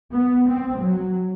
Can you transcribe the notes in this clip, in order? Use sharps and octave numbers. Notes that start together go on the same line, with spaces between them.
B3
C4
F#3